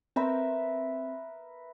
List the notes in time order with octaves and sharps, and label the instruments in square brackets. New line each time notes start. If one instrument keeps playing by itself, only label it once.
[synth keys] C4 [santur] A#4 B4 E5